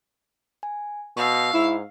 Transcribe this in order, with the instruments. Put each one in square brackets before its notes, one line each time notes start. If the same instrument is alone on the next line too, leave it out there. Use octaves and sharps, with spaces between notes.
[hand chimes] G#5
[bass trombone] B2 [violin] F5 [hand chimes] C#6 E6
[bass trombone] G#2 [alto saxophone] E4